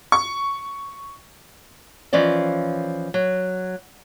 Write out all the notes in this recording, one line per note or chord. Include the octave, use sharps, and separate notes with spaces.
C#6
E3 F3 C#4 D5 D#5
F#3